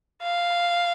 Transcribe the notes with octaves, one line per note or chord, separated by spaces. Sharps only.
F5